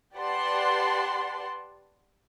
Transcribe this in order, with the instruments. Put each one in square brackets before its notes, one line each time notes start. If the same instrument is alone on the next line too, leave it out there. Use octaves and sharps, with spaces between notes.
[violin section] G4 B4 D5 F#5 A5 C6